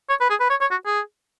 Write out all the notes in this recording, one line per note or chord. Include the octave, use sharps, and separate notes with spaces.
C#5
B4
G#4
B4
C#5
C#5
F#4
G#4